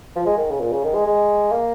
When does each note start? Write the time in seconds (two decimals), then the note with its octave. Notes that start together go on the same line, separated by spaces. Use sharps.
0.16 F3
0.26 G#3
0.37 D#3
0.50 C#3
0.60 A#2
0.72 C#3
0.84 D#3
0.94 G#3
1.07 G#3
1.51 A#3